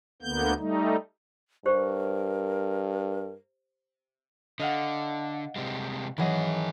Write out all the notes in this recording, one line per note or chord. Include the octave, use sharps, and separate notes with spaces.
D2 D3 A#3 B3 G6
G3 A3 D#4
G2 G4 A#4 C5
D3 D#5 F5 F#5
C3 G3 G#3
D#3 E3 F#3 G#4 D#5